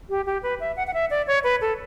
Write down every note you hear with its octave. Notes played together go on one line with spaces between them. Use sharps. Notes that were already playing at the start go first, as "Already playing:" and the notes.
G4
G4
B4
E5
F#5
F#5
E5
D5
C#5
B4
A4